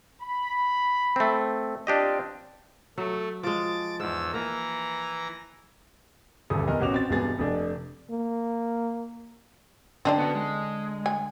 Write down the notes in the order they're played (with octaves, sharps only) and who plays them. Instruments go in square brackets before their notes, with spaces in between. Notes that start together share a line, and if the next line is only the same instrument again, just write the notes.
[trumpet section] B5
[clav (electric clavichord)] A3 C4
[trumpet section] C4 F4 [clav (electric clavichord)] D4 G4 D#5
[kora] F#3 [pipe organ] A3
[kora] F3 G#3 [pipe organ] D6 A6
[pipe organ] E2 E6 [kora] G#2
[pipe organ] E3 A#5 [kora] A#3
[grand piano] D#1 D2 G2 G#4 A4 D#6
E2 A#4 D#5
A1 B2 F#4 C#5 D6 F7
C4 A6
E1 G2 G#3 B3 G#4 A6
F1 A3 D4
[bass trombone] A#3
[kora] D3 [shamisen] C4 D4 D#4
[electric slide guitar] B3 F#4
G#3
[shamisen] G#5